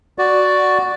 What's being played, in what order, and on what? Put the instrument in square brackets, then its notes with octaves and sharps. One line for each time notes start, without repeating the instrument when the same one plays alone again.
[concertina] F#4 D5